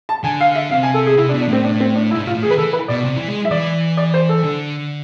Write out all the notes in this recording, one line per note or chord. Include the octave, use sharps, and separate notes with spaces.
A5
D3 G#5
F5
E5
C3 F5
G#5
A4
G#4
C3 E4
D4
B2
D4
A2 C4
D4
C4
D4
G#2 E4
A2
F4
A2
G#4
E3
B4
E3 A4
B4
B2 D5
C3
E3
G#3
E5
E3 D5
D5
C5
A4
D3